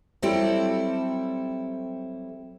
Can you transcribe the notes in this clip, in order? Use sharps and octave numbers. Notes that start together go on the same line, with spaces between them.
F#3 G3 C4 E4 G4 A4